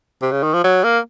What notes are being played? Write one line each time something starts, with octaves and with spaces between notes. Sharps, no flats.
C3
C#3
D#3
F3
F#3
A#3